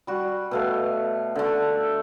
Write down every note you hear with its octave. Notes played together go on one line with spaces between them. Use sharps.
G3 F#4
B2 A3 F5
D3 A3